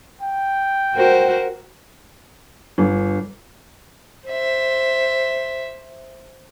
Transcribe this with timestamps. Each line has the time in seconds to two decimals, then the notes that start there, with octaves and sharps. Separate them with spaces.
0.22 G5
0.95 F#4 A#4 C5
2.78 G1
4.28 C5 E5